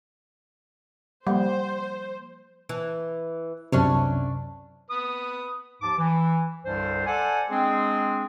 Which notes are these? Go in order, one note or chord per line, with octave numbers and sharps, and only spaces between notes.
F3 G3 A#3 C5 F#5
E3
C2 F#2 C3 C#4 D4 C#5
B4 D#6
D#2 G#2 F3 A5 D6
E3
C2 G2 D3 G3 C5
A4 C5 D5 F#5 G#5
G#3 C4 D4 G#4